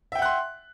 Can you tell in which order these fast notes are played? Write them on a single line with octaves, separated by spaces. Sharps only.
E5 G5 F#5 F#6 C6